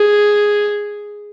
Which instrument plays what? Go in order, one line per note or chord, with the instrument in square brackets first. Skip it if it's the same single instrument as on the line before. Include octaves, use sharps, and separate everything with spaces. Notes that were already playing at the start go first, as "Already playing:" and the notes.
Already playing: [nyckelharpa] G#4